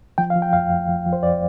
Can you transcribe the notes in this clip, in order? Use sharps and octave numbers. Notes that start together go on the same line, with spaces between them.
F3 G5
F5
F3
G5
F2 F5
F2
F3
F3
C5
F2 D5